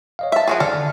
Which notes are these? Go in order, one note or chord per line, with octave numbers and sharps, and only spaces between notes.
C#5 D#5 F5
E5 A5
F3 F#4 G#4
D3 A4 D5 F6